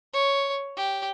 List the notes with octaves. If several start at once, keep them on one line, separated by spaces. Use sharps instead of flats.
C#5
G4